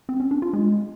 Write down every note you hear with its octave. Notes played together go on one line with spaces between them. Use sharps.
C4
C#4
D4
F4
G#3